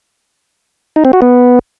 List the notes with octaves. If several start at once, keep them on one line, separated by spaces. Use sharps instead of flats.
D#4
C4
F#4
B3